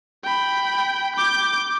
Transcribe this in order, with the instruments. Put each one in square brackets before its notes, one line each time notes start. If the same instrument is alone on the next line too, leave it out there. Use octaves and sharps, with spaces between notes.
[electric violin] G5 B5
D6 G6